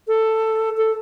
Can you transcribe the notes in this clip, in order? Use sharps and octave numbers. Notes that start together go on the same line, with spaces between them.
A4
A4